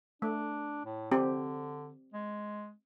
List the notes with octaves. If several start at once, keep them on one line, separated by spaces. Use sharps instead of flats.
A3 D4
A2
D3 C4 G4
G#3